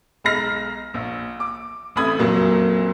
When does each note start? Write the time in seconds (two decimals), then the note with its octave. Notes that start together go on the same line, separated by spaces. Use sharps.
0.24 B1 G#3 A#5 B5 F6 A#6
0.94 A#1
1.40 D6
1.96 A1 C3 A3 B5 D#6 G#6
2.18 F#1 F2 A#2 F#3 A#3